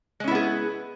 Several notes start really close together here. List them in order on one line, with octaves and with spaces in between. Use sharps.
G#3 C#4 E4 B3 G#4